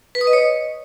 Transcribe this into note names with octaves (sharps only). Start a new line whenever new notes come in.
B4
D#6
D#5
C#5